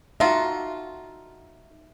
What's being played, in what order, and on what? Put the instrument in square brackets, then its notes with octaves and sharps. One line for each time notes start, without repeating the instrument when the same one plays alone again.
[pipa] D3 F4 [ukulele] D#4 F#4 [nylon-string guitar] E5